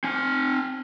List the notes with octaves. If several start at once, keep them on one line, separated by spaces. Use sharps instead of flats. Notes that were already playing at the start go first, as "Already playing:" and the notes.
C4 G#5